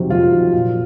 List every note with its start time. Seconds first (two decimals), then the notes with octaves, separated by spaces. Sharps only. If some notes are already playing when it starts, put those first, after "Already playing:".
Already playing: F2 C3 D#3 F#3
0.10 F2 F4
0.32 C3 D#3 F#3
0.53 A#2